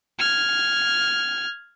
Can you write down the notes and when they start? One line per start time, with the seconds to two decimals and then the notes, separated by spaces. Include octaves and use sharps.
0.19 F6 G#6